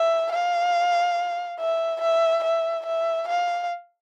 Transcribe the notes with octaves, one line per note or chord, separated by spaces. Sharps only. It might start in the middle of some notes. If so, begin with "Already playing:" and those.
Already playing: E5
F5
E5
E5
E5
E5
F5